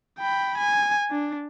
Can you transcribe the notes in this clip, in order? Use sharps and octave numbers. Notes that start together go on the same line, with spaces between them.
G5 B5
G#5
D4